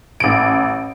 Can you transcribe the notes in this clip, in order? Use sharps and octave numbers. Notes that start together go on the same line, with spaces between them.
A1 D7